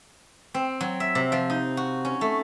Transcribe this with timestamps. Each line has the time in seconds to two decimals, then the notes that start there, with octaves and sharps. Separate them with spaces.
0.54 C4
0.81 F#3
1.00 E5
1.15 C3
1.32 F3
1.50 D#4
1.77 F#4
2.05 C#4
2.21 A3